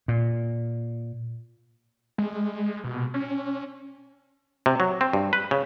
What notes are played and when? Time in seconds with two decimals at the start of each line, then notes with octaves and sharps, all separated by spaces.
0.08 A#2
2.18 G#3
2.84 B2
3.14 C#4
4.66 C3
4.80 F#3
5.01 C4
5.13 G2
5.33 B4
5.51 C#3